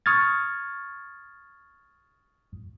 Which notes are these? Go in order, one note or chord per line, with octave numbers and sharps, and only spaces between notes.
C#6 D#6 F6 G#6 A6